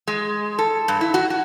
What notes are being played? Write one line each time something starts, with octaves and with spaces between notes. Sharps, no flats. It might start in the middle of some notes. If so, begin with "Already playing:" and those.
G#3
A4
G2
E4
F#4
F#4